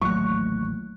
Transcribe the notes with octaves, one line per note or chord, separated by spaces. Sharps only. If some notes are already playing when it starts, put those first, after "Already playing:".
A1 D#2 A#2 F#3 A3 C#6 F#6